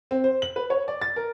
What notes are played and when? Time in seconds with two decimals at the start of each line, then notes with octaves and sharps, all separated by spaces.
0.11 C4
0.24 C5
0.42 F#7
0.56 B4
0.70 C#5
0.88 D5
1.01 A6
1.16 A#4